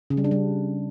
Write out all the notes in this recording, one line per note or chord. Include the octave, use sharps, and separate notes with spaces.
C#3
G3
D4
G3